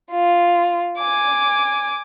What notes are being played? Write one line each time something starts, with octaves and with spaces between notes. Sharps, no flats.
F4
G#5 D6